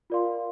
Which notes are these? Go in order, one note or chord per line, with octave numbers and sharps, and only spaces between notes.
F4 A#4 D5 F5 C6